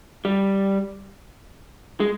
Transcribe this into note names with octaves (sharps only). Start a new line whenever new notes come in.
G3
G#3